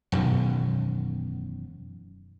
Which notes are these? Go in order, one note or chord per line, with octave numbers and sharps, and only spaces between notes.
E1 F#2 B2 D#3